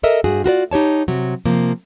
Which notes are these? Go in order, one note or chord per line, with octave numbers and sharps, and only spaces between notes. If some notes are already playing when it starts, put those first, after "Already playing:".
A4 A#4 D#5 E5
G2 F#4 G#4
F4 F#4 A#4 D5
D#4 G4 C#5 A5
C3 F#3
C3 F3 A#3